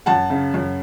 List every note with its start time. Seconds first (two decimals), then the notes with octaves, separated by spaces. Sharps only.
0.06 F#2 F#5 A5
0.30 C#3
0.54 F#2